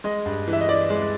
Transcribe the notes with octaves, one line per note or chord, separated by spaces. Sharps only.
G#3 D#5
G2
E3
E5
D#5
E3 D5
G#3